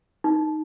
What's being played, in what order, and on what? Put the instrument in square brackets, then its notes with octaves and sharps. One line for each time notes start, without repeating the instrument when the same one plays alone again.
[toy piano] D#4